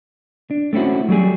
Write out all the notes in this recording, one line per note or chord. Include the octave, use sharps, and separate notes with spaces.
D4
A3 C4 C#4 E4 F#4
F#3 G3 A3 G#4